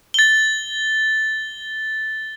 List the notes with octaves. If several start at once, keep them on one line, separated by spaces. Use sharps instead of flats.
A6 G7